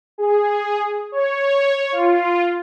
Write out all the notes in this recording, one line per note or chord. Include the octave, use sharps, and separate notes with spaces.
G#4
C#5
F4